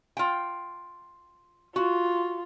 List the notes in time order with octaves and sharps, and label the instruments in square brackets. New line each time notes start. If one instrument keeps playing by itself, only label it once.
[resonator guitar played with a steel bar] F4 G5
[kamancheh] F4 [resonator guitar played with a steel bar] F#4